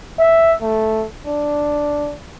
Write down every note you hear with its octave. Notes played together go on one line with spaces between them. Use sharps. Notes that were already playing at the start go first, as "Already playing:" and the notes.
E5
A3
D4